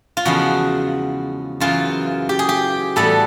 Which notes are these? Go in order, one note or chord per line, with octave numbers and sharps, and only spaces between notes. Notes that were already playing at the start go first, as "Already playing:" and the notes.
F4
E2 C#3 F3 G#3 B3 F#4
F#2 C#3 E3 F4
G4
G#4
G4
A2 E3 G3 B3 A4